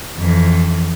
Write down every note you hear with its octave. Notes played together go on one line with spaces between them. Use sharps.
F2 E3